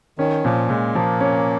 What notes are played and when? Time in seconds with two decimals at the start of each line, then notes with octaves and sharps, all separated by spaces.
0.18 D#3 C#4
0.44 A#2 F3
0.69 A#2 G#3
0.95 F3 A#3
1.20 C#4